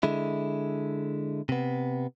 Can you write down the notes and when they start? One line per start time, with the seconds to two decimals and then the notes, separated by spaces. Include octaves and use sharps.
0.03 D3 G#3 E4
1.49 C3 B3